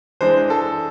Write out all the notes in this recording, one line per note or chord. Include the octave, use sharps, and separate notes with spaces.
E3 G#3 D4 C5
A4